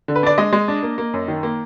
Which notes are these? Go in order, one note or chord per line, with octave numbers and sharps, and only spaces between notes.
D3
B4
D4 D5
G#3 D#5
G#3
D4
A#3
A#3
F#2
D#3
A#3